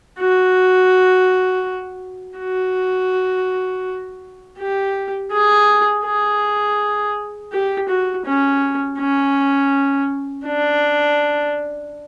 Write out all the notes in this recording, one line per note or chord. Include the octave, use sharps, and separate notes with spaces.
F#4
F#4
G4
G#4
G#4
G4
F#4
C#4
C#4
D4